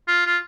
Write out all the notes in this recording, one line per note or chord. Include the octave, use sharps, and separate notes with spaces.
F4
F4